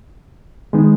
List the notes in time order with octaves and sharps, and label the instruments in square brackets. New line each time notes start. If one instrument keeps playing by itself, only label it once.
[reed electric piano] D#3 G#3 B3 D#4